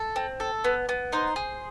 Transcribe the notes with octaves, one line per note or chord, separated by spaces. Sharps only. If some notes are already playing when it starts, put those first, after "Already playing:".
Already playing: A4
C4
A4
B3
B3
D#4 C5
G#4